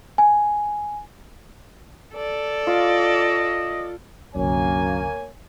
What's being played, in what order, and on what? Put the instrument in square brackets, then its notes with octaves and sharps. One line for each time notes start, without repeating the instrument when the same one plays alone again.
[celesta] G#5
[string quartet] A4 D5
[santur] F4 [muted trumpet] D#5
[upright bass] C2 D3 [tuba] F#2 [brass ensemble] A#3 C#5 G#5